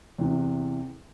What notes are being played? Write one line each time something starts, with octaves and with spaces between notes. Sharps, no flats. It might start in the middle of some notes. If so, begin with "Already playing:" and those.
E2 C3 E3